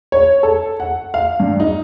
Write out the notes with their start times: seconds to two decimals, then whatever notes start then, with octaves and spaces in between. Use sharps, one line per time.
0.12 C#5
0.43 A4
0.80 F#5
1.14 F5
1.40 G2
1.60 D#4